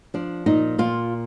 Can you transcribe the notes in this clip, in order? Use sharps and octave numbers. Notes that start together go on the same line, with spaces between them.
F3 D4
A#2 D#4
A#2 F4